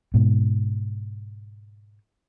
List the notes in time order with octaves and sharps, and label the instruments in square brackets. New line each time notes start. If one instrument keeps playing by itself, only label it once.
[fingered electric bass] G#2 B2